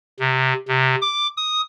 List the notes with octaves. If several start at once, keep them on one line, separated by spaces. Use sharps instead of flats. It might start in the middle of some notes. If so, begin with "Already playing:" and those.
C3
C3
D6
D#6